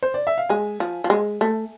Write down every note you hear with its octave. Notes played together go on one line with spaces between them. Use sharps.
C5
D5
E5
F5
G#3 G#5
F3
F3
G#3
A3